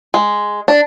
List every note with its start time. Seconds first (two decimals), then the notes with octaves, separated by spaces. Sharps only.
0.14 G#3
0.68 D4